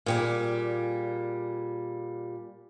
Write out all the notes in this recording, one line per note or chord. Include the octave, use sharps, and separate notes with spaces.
A#2 G3 G#4